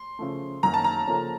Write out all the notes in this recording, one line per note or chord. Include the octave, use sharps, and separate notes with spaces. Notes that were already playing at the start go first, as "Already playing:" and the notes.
Already playing: C6
C#3 F3 A3
F#2 D#3 F#3 A#3 A#5
A5
A#5
C#3 F3 A#3 C#4 A4